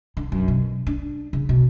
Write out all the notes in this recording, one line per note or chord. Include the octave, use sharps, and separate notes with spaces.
D3
F#2
B2
D4
C#3
B2